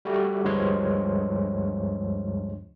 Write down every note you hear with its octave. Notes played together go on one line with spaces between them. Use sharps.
G3 A3 F#4 G4
D2 G2 F3 G#3 C#5 C6